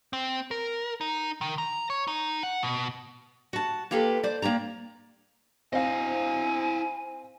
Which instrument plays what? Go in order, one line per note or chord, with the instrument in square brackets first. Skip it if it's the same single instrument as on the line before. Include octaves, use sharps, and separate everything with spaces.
[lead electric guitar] C4
A#4
D#4
D#3
A#5
C#5
D#4
F#5
B2
[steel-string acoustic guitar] F#4 A5
A#3 F4 G4 A4 B4
C5 D5
A#3 C4 D5 A#5
[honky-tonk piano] C4 F5 [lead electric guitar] E4 D#5 [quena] G#5